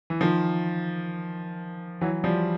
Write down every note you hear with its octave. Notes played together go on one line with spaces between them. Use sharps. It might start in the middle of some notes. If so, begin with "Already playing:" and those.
E3
D#3 F3
E3 F#3
F3 G3